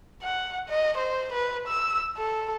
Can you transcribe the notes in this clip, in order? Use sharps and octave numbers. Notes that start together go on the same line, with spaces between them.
F#5
D#5
C5
B4
E6
A4